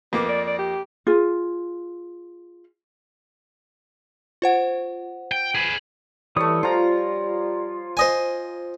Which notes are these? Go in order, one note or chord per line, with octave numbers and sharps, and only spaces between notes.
F2 A#3 B3 D6
D5
D5
G4
F4 G#4
F4 C5 F#5
G5
G#4 B4
E3 G3 A3 C#5 D#6
F3 F4 A#5
C5 D#5 G#5